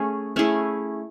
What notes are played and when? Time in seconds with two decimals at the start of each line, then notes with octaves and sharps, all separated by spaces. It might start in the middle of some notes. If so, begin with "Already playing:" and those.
Already playing: A3 C#4 G#4
0.36 A3 C#4 E4 G#4